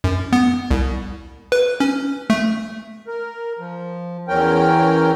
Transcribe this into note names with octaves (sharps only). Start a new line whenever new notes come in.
F#2
B3
C2
B4
C#4
A3
A#4
F3
E2 C#4 A#4 G5